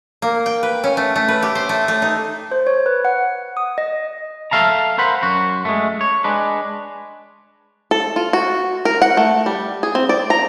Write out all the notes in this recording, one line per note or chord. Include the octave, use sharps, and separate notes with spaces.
A#3
G5
B4
C#4
A3
A3
B4
G4
C5
A3
A3
D#4
C5
C#5
B4
F#5
D#6
D#5
A4 B4 E5 F5 A5 A#5
A#4 C5 F#5 B5
F#2 F#4
G#3 A3
C#5
G#3 D4 B4
A4
F4
F#4
A#4
F#5
A3
G3
G#4
C4
D5
A#5